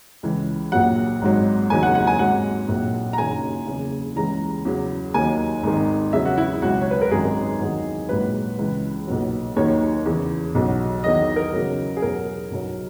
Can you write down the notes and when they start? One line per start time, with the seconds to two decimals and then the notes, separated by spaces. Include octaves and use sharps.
0.23 C#2 C#3 E3
0.72 A#1 A#2 F#3 F#5
1.22 G#1 G#2 F#3
1.70 F#1 E2 D#3 F#3 G#5
1.83 F#5
1.95 F#5
2.07 G#5
2.19 G#1 G#2 F#3 F#5
2.69 A#1 A#2 F#3
3.13 A#5
3.18 F#1 F#2 D#3 F#3 G#5
3.67 F#1 E2 C#3
4.16 C#2 C#3 E3 A#5
4.65 E2 C#3 F#3
5.14 D#2 D#3 F#3 G#5
5.63 G#1 G#2 D#3
6.13 E2 C#3 F#3 E5
6.25 F#4
6.37 E4
6.62 C#2 B2 F#3 F#4
6.81 C#5
6.91 B4
7.01 A#4
7.11 G#1 F#2 D#3 F#3 G#4
7.60 E2 D#3 F#3
8.09 A#1 G#2 F#3 B4
8.58 C#2 C#3 E3
9.08 B1 A#2 F#3
9.56 D#2 D#3 F#3 C#5
10.06 E2 C#3 E3
10.55 B1 B2 F#3
11.04 E2 D#3 F#3 D#5
11.36 A#4
11.53 E2 C#3 F#3
11.97 G#4
12.02 E2 B2 F#3 A#4
12.51 B1 B2 F#3